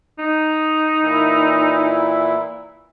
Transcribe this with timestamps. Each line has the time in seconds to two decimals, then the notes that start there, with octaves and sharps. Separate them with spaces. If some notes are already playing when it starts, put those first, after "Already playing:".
0.19 D#4
1.02 A#2 E3 E4